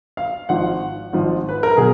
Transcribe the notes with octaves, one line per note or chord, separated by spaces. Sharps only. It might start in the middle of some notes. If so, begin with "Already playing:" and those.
F5
G#1 G#2 F3 F#5
G#1 G#2 F3
B4
A#4
B2 F#3 G#4